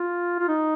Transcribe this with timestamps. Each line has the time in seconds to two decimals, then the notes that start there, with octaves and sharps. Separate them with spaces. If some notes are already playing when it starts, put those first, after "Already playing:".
Already playing: F4
0.39 F4
0.48 D#4